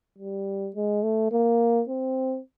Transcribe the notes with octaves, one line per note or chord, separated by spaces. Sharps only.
G3
G#3
A3
A#3
C4